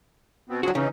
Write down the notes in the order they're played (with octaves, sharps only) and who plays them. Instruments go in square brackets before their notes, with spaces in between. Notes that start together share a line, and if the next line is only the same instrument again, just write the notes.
[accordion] B2 B3 C4
[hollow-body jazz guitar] F#3 F#4 [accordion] C4 D4 G#4
[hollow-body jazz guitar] C#3 [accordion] E3 C#4 D#4